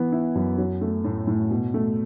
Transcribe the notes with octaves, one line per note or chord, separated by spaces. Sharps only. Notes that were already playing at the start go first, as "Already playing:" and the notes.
Already playing: E3 B3
E4
F#2
F#3
A3
A2
A2
B2
A3